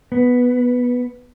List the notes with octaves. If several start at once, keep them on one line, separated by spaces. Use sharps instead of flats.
B3